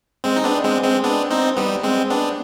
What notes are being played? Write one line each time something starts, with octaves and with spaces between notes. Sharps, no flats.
G#3 C4
D#4
B3 D4
G#3 C4
G#3 C4
B3 D4
C4 D#4
G3 B3
G#3 C4
B3 D4